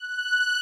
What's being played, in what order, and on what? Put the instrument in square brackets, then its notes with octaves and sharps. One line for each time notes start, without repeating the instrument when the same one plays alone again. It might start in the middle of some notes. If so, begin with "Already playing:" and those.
Already playing: [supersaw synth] F#6